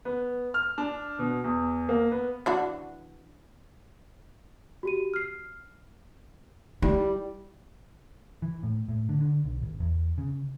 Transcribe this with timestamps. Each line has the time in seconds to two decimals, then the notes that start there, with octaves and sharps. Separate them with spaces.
0.05 B3
0.54 F6
0.78 D4
1.19 B2
1.44 E2
1.89 A#3
2.12 B3
2.46 E3 D4 F#4
4.83 F#4 G4 D#7
5.14 F6 C7
6.82 G3 E4
8.42 E3
8.63 A2
8.89 A2
9.09 D3
9.20 D3
9.44 B1
9.62 G#1
9.80 E2
10.18 C#3